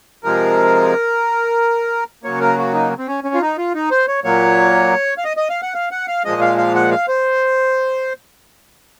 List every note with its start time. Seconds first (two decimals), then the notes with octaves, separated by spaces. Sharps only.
0.24 C3 F3 G#3 A#4
2.24 C#3 F#3 A#3 C#5
2.41 A#4
2.57 F#4
2.74 D#4
2.98 C4
3.07 C#4
3.24 C#4
3.34 F4
3.42 D#4
3.58 F4
3.75 D#4
3.91 C5
4.08 C#5
4.24 A#2 F#3 A#3 C#5
5.18 F5
5.25 D#5
5.37 D#5
5.50 F5
5.62 F#5
5.74 F5
5.91 F#5
6.08 F5
6.25 A#2 F3 G#3 D#5
6.41 F5
6.58 F5
6.75 F#5
6.91 F5
7.08 C5